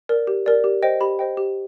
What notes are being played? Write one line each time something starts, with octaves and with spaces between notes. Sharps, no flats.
A#4 D5
G4
A#4 D5
G4
C5 D#5 G5
G4 B5
C5 D#5 G5
G4